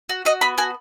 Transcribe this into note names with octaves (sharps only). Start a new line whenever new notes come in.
F#4
F#4 D#5
B3 B5
F#4 G#5